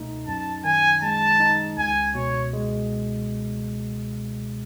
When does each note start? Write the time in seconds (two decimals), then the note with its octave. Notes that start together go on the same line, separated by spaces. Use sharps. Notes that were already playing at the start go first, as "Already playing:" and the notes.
Already playing: C#2 B2 A3 D#4
0.27 F#2 A5
0.65 D#3 G#5
1.02 G#3 A5
1.40 D#4
1.77 C#2 G#5
2.15 B2 C#5
2.53 G#3